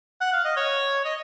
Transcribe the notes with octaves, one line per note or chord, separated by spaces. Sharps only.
F#5
F5
D#5
C#5
D#5